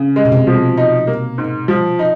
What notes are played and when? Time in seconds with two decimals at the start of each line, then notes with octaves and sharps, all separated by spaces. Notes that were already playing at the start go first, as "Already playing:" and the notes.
Already playing: C#3
0.16 G#3
0.25 B2
0.32 C3
0.47 F3
0.77 D#4
1.07 A#3
1.38 G#2
1.68 F3
1.99 D#4